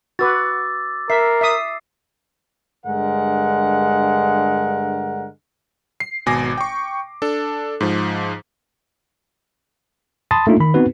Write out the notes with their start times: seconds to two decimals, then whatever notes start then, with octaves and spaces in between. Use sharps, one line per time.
0.19 F#4 B4 D6 E6 A6
1.10 A#4 E5 C7
1.41 E5 D#6
2.86 G2 D3 G#3 A#4 F#5
6.00 C7
6.26 G#1 B2 G#5 D6 A#6
6.58 G5 C#6
7.22 D4 A4
7.81 G#2 F3
10.31 A5 B5 C6 D#6 A6
10.47 A3 A#3 D4 D#4 F4
10.60 D#3 B5
10.74 B3 C4 D#4 F#4 B4